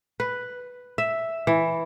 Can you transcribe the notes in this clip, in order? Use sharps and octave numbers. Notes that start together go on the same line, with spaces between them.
B4
E5
E3